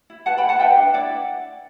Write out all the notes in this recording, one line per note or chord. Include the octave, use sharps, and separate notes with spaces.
E4
B4 F#5 A5
G5 B5
E4
F#5 A5
B4 E5 G5
D4
E4 D5 F#5